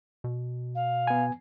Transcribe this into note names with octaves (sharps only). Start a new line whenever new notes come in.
B2
F5
B3 G#5